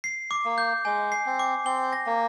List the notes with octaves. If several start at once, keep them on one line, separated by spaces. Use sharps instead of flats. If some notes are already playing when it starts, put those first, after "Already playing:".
C7
D6
A#3
G6
G#3 G#5
C7
C4
D6
C4 G7
A#6
A#3